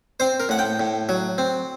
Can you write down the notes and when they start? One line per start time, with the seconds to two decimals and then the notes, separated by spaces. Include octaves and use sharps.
0.20 C4 C5
0.40 A#4
0.49 A2 F#5
0.59 G5
0.80 A2
1.09 F#3
1.38 C4